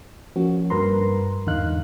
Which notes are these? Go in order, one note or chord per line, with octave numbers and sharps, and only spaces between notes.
F3 A#3 C#4 F#4
G2 A#4 B4 A#5 C6
E2 G#2 D3 D#4 F5 F#6